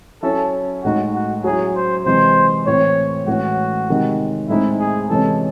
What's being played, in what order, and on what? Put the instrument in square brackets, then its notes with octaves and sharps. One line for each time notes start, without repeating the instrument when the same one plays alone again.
[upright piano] F#3 C#4 E4 [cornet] A4
[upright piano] A2 G#3 D#4 [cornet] F#4
[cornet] F#4
[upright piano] F#3 C#4 E4 [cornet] G#4
[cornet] C5
[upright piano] C3 E3 G#3 [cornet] C5
[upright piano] A2 E3 C4 E4 [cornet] C#5
[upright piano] A2 E3 G#3 C#4 E4 [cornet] F#4
[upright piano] C3 D#3 G#3
[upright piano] A2 G#3 C4 D#4 [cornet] E4
[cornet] G#4
[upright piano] C3 E3 G#3 C#4 [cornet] A4